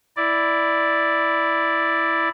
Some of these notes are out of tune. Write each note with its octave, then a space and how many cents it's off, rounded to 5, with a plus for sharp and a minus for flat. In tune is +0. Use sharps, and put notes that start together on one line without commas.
E4 +0 D5 +0